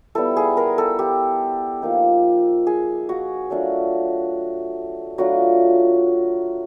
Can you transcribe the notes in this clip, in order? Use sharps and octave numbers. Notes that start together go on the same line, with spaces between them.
G3 B3 E4 A4
G#4
A#4
A4
G4
F3 A#3 D#4
G#4
F#4
F#3 A3 D4 F4
F#3 A3 D4 F4 F#4